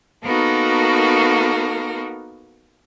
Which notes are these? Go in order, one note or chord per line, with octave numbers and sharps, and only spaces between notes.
A#3 B3 D#4 F#4 A4 A#4